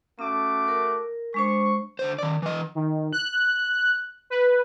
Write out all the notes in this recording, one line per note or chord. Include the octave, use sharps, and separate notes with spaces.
A3 C#4 F#4 D6
A#4
G#3 D4 C5 C#6
D3 C5
D#3 D5
E3 D#5
D#3
F#6
B4